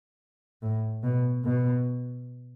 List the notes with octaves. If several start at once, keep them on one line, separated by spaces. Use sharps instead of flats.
A2
B2
B2